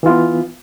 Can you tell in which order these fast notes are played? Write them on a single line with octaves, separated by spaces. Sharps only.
E3 F4 B3